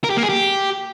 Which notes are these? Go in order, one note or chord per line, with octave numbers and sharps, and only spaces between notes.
A#4
G4
A#3
G#4
G4